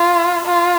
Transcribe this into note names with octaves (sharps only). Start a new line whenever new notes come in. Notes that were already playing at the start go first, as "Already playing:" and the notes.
Already playing: F4
F4